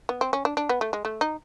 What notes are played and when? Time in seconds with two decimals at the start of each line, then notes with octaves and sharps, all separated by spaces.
0.09 B3
0.21 C4
0.33 C#4
0.45 D4
0.57 D4
0.69 B3
0.81 A3
0.93 G#3
1.05 A3
1.21 D#4